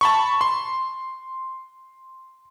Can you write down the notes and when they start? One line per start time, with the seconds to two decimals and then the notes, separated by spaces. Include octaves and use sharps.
0.01 A5 B5 C#6
0.41 C6